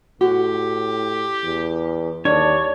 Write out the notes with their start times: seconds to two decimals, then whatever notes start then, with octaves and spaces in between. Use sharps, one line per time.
0.21 A2 F#4 G4
1.44 E2
2.25 D#2 D4 C#5